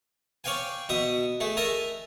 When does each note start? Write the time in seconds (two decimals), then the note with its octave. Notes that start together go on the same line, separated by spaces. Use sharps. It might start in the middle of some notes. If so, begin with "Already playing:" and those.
0.44 C#5 D5 F5 G5 G#5
0.89 B2 E5 D#6
1.40 A3 G#4
1.57 A#4 D#5 E5 G#5 A5